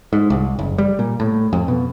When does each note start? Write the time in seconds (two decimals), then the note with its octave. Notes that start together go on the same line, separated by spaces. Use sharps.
0.13 G#2
0.30 C2
0.59 F#1
0.78 G3
0.99 A#2
1.20 A2
1.53 F2
1.68 B2